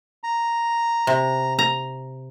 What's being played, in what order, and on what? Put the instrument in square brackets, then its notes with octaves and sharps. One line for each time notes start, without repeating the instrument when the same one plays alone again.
[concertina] A#5
[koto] C3
A#5